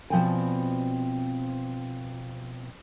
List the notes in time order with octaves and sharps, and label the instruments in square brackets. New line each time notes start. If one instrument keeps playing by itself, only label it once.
[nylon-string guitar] B2 F3 C4 D5 G5 G#5